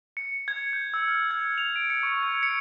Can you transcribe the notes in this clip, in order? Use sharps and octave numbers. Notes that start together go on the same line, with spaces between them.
C#7
G#6
G6
E6
F6
G#6
F7
D7
C#7
C#6
G#6
C#7